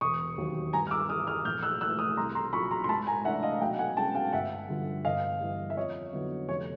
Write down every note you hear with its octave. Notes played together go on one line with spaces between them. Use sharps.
E1 C#6 D#6
D#2 D#3 F#3
G2 G#5 A#5
F6
D6 E6
E3 G3 D#6 F6
D#6 F6
A#1 F6 G6
E6 F#6
A2 E3 E6 F#6
D#6 F6
C2 A#5 C6
A#5 C6
A#2 F#3 B5 C#6
A#5 C6
C6
G#2 A5 B5
G#5 A#5
E3 A3 D4 E5 F#5
D#5 F5
B1 F5 G5
F#5 G#5
B2 G#3 C#4 G5 A5
F5 G5
G1 E5 F#5
G2 D3 F3
G1 D#5 F5
G2 E3
E5
F2 C#5 D#5
D3 F#3 B3 E4
F1 C#5